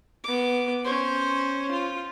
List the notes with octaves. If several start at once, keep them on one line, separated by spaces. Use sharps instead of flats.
B3 D6
C#4 C5
F4